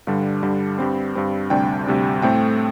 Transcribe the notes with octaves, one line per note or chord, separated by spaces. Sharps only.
G2 D3 G3 D4
G2 D3 G3 D4
G2 G3 C4
G2 G3 C4
D2 C3 G3 D4 G5
D2 C3 G3 D4
A2 A3 C4 G5